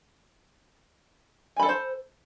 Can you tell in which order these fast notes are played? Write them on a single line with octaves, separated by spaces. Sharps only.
G#5 B5 A4 D#5 C5